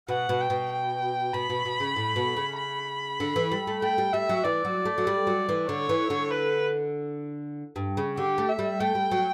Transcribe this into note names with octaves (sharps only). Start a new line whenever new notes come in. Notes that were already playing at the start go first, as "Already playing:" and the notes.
B2 F#5
B2
G5
B2
G5
B2 B5
B2
B2
C#3
A2
B2
C#3
B5
D3
E3
G3
A3
A3 G5
G3
G3 E5
F#3
E3 D5
F#3
A3
F#3
G3
F#3
E3
D3 C#5
E3
D3
B4
G2
C#3
D3 G4
A3
E5
G3
A3 G5
G3
F#3